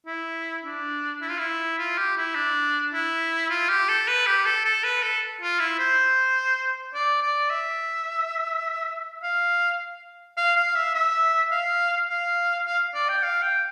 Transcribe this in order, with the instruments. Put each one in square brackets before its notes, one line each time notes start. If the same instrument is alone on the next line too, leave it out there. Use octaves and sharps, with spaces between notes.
[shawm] E4
D4
E4
F4
E4
F4
G4
E4
D4
E4
F4
G4
A4
B4
G4
A4
A4
B4
A4
F4
E4
C5
D5
D5
E5
F5
F5
F5
E5
E5
F5
F5
F5
D5
G5
F5
G5